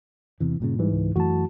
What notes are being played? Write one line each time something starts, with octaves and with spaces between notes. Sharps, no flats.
E2 C3 E3
G2 A#2 C#3
G#2 E3 G3
C#2
F#2 E3 A3 F#4 A5